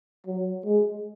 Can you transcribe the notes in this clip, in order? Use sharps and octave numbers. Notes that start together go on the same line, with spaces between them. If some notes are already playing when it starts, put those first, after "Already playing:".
F#3
G#3